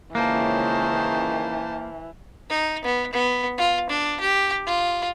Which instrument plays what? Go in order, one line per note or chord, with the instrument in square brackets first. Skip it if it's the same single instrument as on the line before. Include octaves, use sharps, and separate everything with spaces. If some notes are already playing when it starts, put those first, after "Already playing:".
[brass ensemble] C#2 D#3 C#4 [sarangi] E3 [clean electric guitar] A#3 [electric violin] C5 A5
[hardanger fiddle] D#4
B3
B3
F4
D4
G4
F4